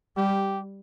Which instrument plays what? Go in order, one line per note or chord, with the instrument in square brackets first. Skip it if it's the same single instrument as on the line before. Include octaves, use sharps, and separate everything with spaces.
[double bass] G3 [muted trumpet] G4